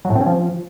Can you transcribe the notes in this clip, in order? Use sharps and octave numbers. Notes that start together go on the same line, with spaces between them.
F#3
A2
C4
C#4
F3